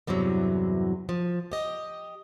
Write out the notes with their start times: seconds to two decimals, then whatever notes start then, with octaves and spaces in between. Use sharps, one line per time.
0.07 E2 G2 C3 E3 F#3
1.09 F3
1.52 G4 D#5